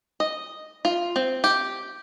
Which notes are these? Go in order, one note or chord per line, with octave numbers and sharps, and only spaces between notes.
D#5
F4
C4
G4